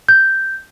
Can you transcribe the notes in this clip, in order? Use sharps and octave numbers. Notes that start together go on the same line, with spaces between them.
G6